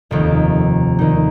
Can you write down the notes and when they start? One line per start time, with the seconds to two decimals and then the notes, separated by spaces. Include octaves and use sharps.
0.11 F1 D#2 D#3
0.99 D#2 D#3 G3 D#4